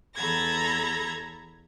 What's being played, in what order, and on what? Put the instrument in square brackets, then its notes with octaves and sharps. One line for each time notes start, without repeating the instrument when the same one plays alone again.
[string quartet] E2 A4 A#5 B5 G#6 A#6